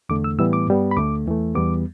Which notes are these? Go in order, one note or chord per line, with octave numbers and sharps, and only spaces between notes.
E2 D3 A3 D6
E6
A2 E3 G3 B3 E6
D6
G2 G3 B3
B5
D2 D3 A3 D6
E2 E3 A3
E2 E3 G3 B3 D6